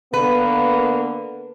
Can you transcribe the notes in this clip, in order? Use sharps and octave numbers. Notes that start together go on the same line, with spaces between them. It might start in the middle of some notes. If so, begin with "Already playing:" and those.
D3 A#3 B3 B4